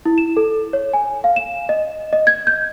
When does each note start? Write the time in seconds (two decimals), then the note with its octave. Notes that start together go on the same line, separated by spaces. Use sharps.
0.05 E4
0.18 E7
0.37 A4
0.73 C#5
0.93 G#5
1.24 F5
1.36 E7
1.69 D#5
2.13 D#5
2.27 G#6
2.47 G6